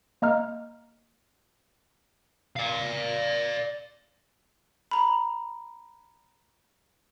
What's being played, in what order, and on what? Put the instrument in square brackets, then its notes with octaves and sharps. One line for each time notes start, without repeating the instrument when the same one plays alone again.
[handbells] A#3 D#5 A#5 F6
[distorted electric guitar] D5 F5
[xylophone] A#5 B5